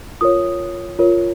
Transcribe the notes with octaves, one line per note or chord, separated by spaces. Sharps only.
F4 A#4 C#5 D#6
F4 A#4 C#5